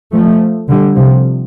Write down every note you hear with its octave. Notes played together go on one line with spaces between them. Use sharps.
F3 A3
D3 G3
C3 F3